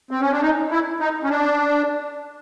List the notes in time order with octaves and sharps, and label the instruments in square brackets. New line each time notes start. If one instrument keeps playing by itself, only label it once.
[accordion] C4
C#4
D4
D#4
E4
D#4
C#4
D4